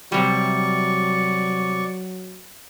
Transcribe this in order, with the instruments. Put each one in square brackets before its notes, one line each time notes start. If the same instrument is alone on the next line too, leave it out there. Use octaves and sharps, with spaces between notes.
[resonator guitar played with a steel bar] C3 G3 [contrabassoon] F#3 [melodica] D5 C#6